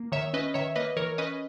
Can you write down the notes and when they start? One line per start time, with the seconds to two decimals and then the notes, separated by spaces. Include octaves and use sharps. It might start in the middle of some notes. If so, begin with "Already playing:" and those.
Already playing: A#3
0.12 D#3 C#5 E5
0.33 C#4 B4 D#5
0.54 D#3 C#5 E5
0.76 A#3 B4 D#5
0.97 E3 A#4 C#5
1.18 C#4 B4 D#5